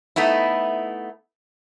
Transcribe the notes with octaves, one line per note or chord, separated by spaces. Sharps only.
A3 B3 D#4 E4